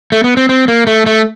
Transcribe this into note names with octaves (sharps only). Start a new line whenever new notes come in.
A3
B3
C4
C4
A#3
A3
A3